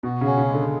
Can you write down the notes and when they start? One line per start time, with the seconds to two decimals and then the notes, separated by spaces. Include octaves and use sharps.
0.03 B2 F#4
0.21 C#3 C#4
0.38 C#3
0.48 G#3
0.54 D3